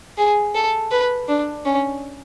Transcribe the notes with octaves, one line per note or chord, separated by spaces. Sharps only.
G#4
A4
B4
D4
C#4